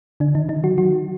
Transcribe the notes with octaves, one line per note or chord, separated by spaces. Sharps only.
D3 D4
D#3 D#4
D#3 D#4
F#3 F#4
F#3 F#4